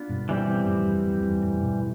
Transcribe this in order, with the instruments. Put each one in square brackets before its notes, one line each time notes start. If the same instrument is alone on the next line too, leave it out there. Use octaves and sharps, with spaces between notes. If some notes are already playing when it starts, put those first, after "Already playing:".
Already playing: [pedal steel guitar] B3 D4 F4
[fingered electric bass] G2 B2
[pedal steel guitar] E3 G3 C4 G4
[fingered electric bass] F2 A2
E2 G2
F2
E2 G2
F2 A2
G2 B2